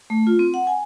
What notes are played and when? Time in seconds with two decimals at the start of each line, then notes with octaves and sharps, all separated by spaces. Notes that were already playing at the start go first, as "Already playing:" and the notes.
0.10 A3
0.27 F4
0.39 C4
0.54 F#5
0.67 G#5